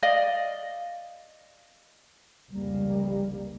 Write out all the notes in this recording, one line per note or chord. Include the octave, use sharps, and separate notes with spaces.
D5 D#5 F5
F1 C#2 G3 A#3